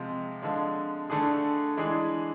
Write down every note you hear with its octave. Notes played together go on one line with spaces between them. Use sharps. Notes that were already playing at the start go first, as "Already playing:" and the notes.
Already playing: C3 F3 G#3
D3 F3 G#3
D3 A3 D4 G#4
E3 G#3 D4 G#4